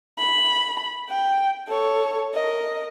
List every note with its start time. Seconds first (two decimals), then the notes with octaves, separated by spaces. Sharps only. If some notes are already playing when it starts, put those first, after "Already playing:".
0.18 B5
1.09 G5
1.67 A4 C#5
2.34 A#4 D#5